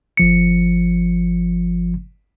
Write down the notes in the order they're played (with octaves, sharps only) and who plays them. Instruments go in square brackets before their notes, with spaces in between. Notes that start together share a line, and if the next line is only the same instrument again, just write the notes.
[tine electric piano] G1 F3 C#7